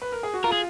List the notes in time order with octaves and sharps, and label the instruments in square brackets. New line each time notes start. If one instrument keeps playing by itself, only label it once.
[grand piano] B4
A#4
G#4
F#4
[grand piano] F4 [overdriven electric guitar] A#4
[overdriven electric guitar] G#4